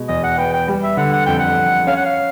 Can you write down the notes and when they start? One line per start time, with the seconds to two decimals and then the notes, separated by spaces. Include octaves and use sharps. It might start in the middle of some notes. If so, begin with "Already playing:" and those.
Already playing: B2 G#3
0.08 E2 D#5
0.23 F#5
0.38 B3 G5
0.53 G5
0.68 G3
0.83 E5
0.97 D3 F#5
1.13 F#5
1.26 F2 G5
1.39 F#5
1.58 F2
1.87 C#4 F5
1.96 F#5
2.05 F5